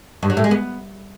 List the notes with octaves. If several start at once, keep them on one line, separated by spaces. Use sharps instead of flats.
G2
F#3
A2
G#3
B3